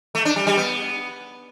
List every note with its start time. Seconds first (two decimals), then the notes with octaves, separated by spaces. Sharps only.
0.15 A3
0.25 D4
0.36 G3
0.47 G3
0.57 B3